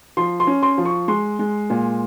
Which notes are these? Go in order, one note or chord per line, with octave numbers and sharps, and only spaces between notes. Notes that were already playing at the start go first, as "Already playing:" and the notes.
F3 C6
C6
C#4
C6
F3
C#6
G#3 C6
G#3
A#2